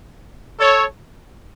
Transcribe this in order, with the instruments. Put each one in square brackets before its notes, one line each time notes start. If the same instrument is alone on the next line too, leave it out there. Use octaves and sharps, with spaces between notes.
[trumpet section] A4 C#5